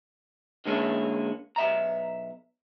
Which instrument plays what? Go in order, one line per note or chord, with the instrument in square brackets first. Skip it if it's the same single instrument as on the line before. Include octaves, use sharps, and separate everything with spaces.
[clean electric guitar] D3 G#3 A#3 C#4 E4
B1 E5 A#5